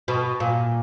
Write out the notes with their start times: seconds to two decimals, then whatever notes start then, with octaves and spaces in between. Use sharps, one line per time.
0.08 B2
0.40 A#2